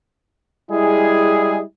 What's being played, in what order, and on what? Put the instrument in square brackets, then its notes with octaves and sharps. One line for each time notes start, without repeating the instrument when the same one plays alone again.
[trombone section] G3 G#3 E4 [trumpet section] G#4